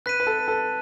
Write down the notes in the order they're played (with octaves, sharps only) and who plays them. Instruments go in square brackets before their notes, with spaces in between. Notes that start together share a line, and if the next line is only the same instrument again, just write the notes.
[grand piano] B4 [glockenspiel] F#6 B6 D#7
[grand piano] B4
A4
A4